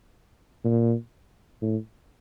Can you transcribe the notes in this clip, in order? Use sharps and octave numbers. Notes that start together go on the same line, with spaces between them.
A#2
A2